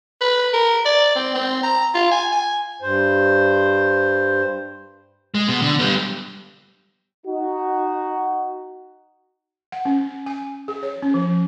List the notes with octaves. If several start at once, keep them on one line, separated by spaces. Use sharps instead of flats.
B4
A#4
D5
C4
C4
A#5
F4
G#5
G#5
G2 C5
G#3
B2
D3
G3 B3
D#4 F#4
F#5
C#4
G#5
G#4
C#5
C#4
F3